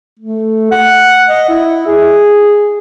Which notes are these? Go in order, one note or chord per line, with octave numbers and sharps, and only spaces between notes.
A3
F#5
D#5
E4
G#4